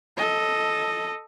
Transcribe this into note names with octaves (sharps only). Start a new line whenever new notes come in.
A4 D#5